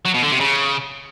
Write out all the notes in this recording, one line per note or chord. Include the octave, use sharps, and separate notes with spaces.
F#3
B2
D3
C3
C#3